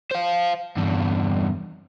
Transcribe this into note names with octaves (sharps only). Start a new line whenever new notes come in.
C5 F5
E2 G2